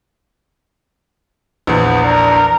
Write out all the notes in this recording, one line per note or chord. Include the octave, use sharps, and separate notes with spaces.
A#1 E2 B3
D4 A#4